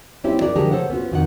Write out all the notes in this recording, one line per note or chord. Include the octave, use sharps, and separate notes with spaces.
G3 C4 C#4 E4 G4
F#4 G#4 A#4 D5
D3 F3 G#3 G4 G#4 A#4
A4 C5 C#5 F#5
B3 C#4 F4 F#4
F2 D#3 F#5